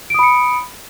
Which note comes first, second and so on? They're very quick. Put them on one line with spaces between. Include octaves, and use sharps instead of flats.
D7 D#6 B5 C#7